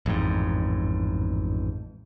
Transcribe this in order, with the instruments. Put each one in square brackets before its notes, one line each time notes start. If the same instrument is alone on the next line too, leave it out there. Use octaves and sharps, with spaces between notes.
[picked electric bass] A1 F2 G#2